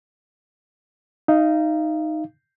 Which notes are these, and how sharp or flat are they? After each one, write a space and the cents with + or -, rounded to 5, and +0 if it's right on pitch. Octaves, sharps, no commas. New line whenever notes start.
D#4 +0 F5 -30